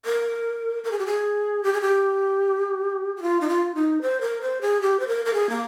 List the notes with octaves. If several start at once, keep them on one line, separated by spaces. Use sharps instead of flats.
A#4
A#4
G#4
G4
G#4
G4
G#4
G4
G4
F4
D#4
F4
D#4
C5
A#4
C5
G#4
G4
C5
A#4
A#4
G#4
A#3